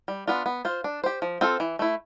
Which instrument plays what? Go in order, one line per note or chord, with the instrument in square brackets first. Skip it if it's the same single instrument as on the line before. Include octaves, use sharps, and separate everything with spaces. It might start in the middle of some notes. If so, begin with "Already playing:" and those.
[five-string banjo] G3
B3 D4 F4
B3
F4 C5
D4
G4 C5
F3
C4 F4 A4
E3
A3 E4